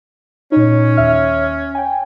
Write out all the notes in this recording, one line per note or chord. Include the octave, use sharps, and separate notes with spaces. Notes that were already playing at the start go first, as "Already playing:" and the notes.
A#2 C#4 D#4
D#2 E5 F6
G5 G#5